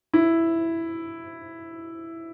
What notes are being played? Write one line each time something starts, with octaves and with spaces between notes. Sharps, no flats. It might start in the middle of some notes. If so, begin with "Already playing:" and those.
E4